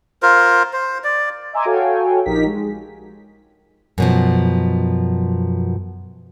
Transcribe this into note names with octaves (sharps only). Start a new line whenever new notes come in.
F4 A#4 C5
C5
D5
D#5 E5 G#5 A#5 C6 D6
F#4 A4 C#5 F5 G5 G#5
A#1 D#4 G4 A#4 B6
G#3
F#2 B2 F3